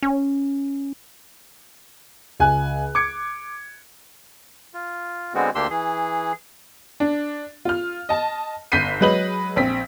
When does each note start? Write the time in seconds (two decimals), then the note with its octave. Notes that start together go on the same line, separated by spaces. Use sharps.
0.03 C#4
2.40 C#2 G#5 F#6
2.95 D6 G#6 C#7
4.74 F4
5.34 D3 G#3 B3 C4 F#4
5.55 D2 A#3 D4 G4 C6 E6
5.70 E3 G#4
7.00 D4
7.65 F4 F6
8.09 D#5 A5
8.72 G1 G6 B6 C7 D#7
9.01 F#3 G#3 B4 D#5 F#7
9.56 A#1 C4 B6